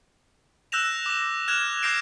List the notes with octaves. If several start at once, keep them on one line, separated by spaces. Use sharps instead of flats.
E6 F#6 G6 A#6 E7 F7
D6 A#6
F6 F#6 G#6 E7 F7
D6 G6 A#6 C7 D7 F7